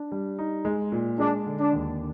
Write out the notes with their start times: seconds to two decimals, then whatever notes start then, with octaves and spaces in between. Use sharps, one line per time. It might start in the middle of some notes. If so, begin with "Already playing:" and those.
Already playing: D4
0.12 G3
0.39 D#4
0.65 G#3
0.92 A#2
1.19 G#3 D4
1.46 D3
1.60 D4
1.73 D#2